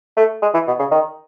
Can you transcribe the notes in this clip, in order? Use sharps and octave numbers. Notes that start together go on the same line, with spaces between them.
A3
G#3
E3
B2
C#3
D#3